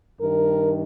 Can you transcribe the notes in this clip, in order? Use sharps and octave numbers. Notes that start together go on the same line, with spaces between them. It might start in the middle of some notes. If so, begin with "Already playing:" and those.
G2 D#3 A#4